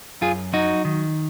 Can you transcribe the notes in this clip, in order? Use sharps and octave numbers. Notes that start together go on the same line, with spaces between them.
F#2 F4 G#4
F#3 D#4 F#4
D#3